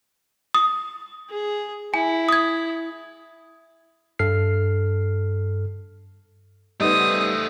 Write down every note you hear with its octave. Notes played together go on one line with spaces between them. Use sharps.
D#6
G#4
E4 G#5
D#6 G#6
G2 A4 F6 C7
G3 A3 B3 D#4 C5 D#6